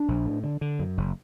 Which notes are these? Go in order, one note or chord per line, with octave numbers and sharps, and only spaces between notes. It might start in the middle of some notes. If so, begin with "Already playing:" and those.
Already playing: D4
A#1
A2
D3
D3
F#2
F#1